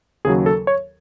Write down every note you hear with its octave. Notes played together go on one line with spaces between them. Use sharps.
D#2 C#3 F#3 G#4
A4
C#5